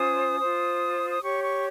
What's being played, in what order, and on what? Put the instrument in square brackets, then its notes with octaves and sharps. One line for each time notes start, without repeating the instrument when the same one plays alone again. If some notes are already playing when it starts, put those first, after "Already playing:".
Already playing: [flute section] C#4 F4 C5 D#6
F4 C5
D#6
G4 C#5 C#6
C#6